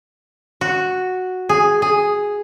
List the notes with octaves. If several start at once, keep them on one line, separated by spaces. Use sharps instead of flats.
F#4
G#4
G#4